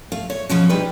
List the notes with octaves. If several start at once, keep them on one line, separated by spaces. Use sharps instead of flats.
A3 F5
C#5
B2 F3 G#3 C#4
G3 G#3 D4 D#4 G4 B4